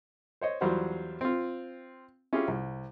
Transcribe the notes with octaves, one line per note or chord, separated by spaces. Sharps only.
C5 C#5 D#5
E2 F#3 G3 F4 C5 F#5
C4 F4
C#4 E4 F4 G4 G#4
C2